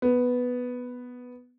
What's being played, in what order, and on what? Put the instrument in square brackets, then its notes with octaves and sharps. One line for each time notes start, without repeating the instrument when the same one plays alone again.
[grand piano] B3